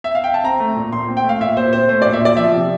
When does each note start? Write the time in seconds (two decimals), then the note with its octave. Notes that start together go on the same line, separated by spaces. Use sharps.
0.04 E5
0.15 F5
0.24 G5
0.34 A5
0.44 C4 A#5
0.60 A3
0.76 A#2
0.92 A#2 C6
1.08 C4
1.17 G5
1.24 A3
1.29 F5
1.41 A#2 E5
1.57 A#2 C5
1.73 C4 C5
1.89 A3 C5
2.02 A#2 D5
2.13 E5
2.21 A#2 D5
2.37 F3 E5
2.54 C3